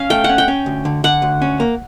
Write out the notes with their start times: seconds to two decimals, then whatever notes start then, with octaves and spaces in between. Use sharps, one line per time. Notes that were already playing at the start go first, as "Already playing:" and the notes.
Already playing: C#4 F5
0.10 A3 G5
0.24 F#5
0.29 C#4
0.38 G5
0.48 C#4
0.66 D2
0.85 D3
1.04 D3 F#5
1.22 D2
1.42 C#4
1.60 A#3